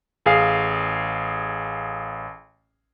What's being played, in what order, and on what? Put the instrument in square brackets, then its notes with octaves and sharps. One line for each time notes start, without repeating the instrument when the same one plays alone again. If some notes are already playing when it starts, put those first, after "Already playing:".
[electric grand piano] A1 G#4 F5 C7